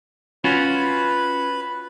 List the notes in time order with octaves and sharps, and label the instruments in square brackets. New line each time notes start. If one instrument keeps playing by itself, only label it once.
[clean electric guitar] C#4 F4 F#4 [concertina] B4 B5